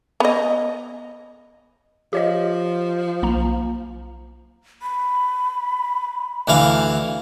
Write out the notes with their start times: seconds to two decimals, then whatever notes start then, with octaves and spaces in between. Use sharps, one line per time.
0.20 B3 D#5
2.13 F3 G4 C#5 D#5
3.22 B1 A#3 A#5
4.82 B5
6.48 D2 E3 F5